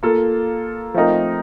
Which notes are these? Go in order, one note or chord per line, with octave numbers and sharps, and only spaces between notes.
A#3 F4 A4
F3 A3 C4 D#4 A#4